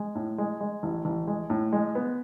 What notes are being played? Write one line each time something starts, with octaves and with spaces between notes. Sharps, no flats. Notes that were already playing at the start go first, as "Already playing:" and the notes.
Already playing: G#3
A2
G#3
G#3
A1
A1
G#3
A2
G#3
B3